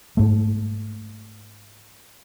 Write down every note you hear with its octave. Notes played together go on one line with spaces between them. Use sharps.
G#2 A3